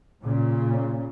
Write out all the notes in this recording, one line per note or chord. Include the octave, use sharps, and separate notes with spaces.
A#2 C#3